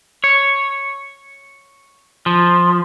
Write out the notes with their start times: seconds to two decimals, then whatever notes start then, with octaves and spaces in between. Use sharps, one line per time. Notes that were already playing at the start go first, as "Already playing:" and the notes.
0.24 C#5
2.26 F3